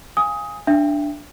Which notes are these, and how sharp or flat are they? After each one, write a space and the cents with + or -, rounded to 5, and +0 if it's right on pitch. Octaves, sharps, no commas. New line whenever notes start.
F5 +0 G#5 -15 D#6 +20
D4 +0 E5 +35 G5 +0